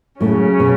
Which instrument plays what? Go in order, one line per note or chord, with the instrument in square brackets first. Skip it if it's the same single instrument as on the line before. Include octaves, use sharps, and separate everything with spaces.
[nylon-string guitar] A2 A3 [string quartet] C#3 F#3 C#4
[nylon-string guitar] B2 B3